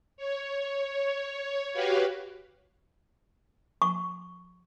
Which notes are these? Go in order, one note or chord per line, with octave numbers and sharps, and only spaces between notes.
C#5
F#4 G4 B4 C#5 F5
C#6